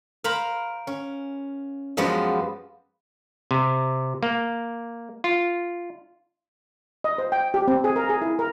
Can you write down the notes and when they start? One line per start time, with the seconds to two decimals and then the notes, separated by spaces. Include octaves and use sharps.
0.24 A#4 C5 F5 A#5 B5
0.87 C#4
1.97 F#2 F3 G#3 B3 F#4 G4
3.51 C3
4.23 A#3
5.24 F4
7.04 D#5
7.18 C5
7.32 G5
7.54 G4
7.68 C4
7.84 G#4
7.96 A#4
8.09 G#4
8.22 E4
8.39 A#4